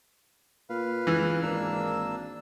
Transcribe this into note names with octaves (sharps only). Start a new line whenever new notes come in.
A#2 B4 F5
C#2 E3
G#1 A#3 D4 E6